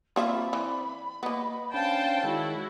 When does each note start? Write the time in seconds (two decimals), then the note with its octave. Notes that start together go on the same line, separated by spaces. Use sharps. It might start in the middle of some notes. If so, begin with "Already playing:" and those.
0.16 A#3 C4 F4 D5 E5 B5
0.53 E3
1.23 A#3 B3 D#5
1.74 C#4 D4 C5 F5 G5 A5
2.24 D#3 G#3 E4 F#4 C#5